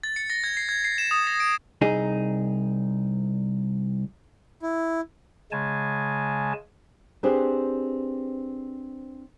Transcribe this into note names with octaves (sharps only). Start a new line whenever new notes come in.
A6
C#7
A#6
G#6
C7
G#6
C7
E7
D#6
A#6
D7
C2 D#4 G#4
E4
C#3 G#3 G#5 A5
C4 D4 G4 G#4 B4 C5